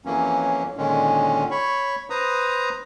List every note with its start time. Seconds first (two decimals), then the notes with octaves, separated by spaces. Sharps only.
0.05 F2 E3 F#3 A#3 C#4
0.77 A#2 D3 D#3 G#3 C#4
1.51 C#5 B5 C#6
2.10 B4 C5 A#5 D#6